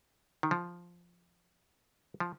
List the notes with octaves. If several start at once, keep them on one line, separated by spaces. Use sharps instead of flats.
D#3
F3
F3